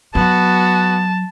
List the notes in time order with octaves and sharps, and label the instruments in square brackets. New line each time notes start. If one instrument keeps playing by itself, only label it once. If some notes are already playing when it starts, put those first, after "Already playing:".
[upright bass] F#3 [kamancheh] B3 F#4 [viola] A5